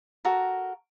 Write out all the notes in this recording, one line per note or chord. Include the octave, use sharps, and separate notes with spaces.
F#4 A4 A#4